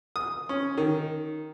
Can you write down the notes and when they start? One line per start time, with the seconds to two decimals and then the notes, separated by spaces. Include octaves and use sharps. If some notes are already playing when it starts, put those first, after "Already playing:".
0.16 D#6
0.49 C#4
0.77 D#3